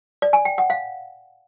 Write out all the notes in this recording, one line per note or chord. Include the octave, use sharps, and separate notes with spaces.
D5
G#5
G5
F#5
F5